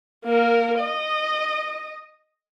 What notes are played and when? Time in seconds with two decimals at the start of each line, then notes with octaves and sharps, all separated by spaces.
0.25 A#3 A#4
0.79 D#5